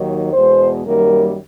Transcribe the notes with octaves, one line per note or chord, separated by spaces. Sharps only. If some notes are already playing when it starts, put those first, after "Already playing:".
Already playing: D#2 D#3 F#3
E2 B2 G#3 C5
F#2 D#3 G3 A#3 A#4